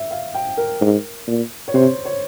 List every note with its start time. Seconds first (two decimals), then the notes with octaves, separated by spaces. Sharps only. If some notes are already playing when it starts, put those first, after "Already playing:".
Already playing: E5
0.11 F5
0.34 G5
0.57 A#4
0.81 G#2
1.27 A#2
1.68 C#5
1.74 C3 C5
2.05 C#5